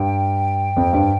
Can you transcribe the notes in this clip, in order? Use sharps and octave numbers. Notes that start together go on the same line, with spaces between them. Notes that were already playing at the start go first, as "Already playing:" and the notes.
Already playing: G2 G5
F2
G2